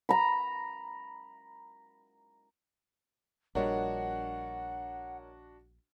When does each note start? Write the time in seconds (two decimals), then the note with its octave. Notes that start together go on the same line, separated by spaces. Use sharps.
0.09 A#5 B5
3.55 A#1 G3 D4 F#4 A#4 C#5 D#5 F#5